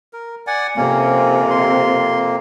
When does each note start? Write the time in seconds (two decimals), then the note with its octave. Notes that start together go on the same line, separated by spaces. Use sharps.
0.13 A#4
0.47 D5 F#5 G#5
0.77 F2 C3 A#3 C#4
1.50 C6